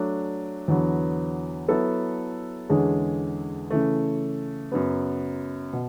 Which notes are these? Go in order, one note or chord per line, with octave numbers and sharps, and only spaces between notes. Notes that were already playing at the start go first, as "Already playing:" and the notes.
Already playing: F#3 A3 D4
E2 D3 F#3 B3
F#3 B3 E4 A4
E2 D3 G#3 C#4 G#4
C#3 E3 A3
F#2 C#3 F#3 B3
B2